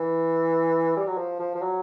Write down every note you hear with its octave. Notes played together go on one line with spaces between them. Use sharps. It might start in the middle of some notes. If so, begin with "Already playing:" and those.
Already playing: E3
G3
F#3
F3
F3
F3
F#3